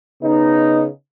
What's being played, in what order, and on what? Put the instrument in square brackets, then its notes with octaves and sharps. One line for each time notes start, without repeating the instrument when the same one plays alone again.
[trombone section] C#3 B3 D#4